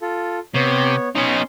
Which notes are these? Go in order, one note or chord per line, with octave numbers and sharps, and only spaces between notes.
F4 A4
C3 B3 C#5
B3 C#4 D#4 C6